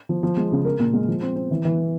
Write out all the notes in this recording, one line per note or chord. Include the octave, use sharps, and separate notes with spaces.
F3
F3
G#3
C#3
A#4
A#2
G#3
F3
C4
C4
E3
E3